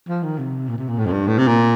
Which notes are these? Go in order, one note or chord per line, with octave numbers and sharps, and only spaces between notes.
F3
D#3
C3
A#2
C3
A#2
A2
F2
G2
A2
C3
A#2